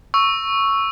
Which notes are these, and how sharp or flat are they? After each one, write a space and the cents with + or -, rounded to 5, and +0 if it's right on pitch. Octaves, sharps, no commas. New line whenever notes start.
C#6 +0 E6 +0